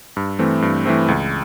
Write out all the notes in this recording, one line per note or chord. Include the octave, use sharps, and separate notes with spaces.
G2
E3 A3 C4
G2
E3 A3 C4
C#2